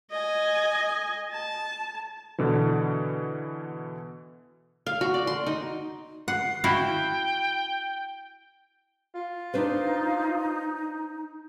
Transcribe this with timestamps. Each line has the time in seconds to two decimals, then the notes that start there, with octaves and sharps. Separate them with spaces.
0.11 D#5 G#5
1.32 A5
2.38 B2 D3 E3
4.86 F5
5.01 F#4
5.14 D5
5.27 C6
5.46 D#4
6.28 F#5 C7
6.64 E4 F#4 F5 G5
9.15 F4
9.54 D4 D#4 B4 C5